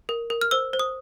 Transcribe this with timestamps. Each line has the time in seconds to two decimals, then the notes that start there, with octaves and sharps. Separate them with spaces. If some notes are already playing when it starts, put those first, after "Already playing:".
0.09 A#4
0.30 A#4
0.41 F6
0.51 C5 E6
0.73 C5
0.79 D#6